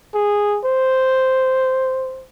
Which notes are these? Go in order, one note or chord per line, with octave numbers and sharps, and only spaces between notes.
G#4
C5